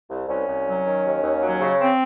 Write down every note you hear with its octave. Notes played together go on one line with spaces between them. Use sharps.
C2
C2 C#4
C2
F#3
D#3
D#2
D#2
F#3
C#3
C4